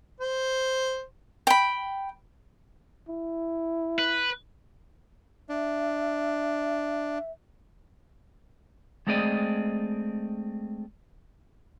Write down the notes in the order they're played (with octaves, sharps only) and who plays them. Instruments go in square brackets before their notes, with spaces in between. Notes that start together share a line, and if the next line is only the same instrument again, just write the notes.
[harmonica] C5
[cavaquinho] G5 B5
[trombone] E4
[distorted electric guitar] B4
[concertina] D4 [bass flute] E5
[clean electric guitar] G#3 A3 C4 G#4 D5 D#5